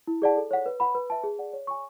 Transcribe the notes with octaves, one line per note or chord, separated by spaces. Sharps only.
E4
G#4 D5 F#5 A5
A4
C#5 F#5
B4
F#5 B5
B4
E5 A5
G#4
D5 F#5
C#5
G#5 C#6